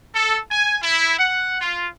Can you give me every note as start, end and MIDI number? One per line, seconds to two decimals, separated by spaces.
0.15 0.39 69
0.51 0.78 80
0.83 1.15 64
1.19 1.58 78
1.62 1.87 65